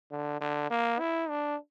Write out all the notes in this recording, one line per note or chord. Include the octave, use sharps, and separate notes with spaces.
D3
D3
A#3
E4
D4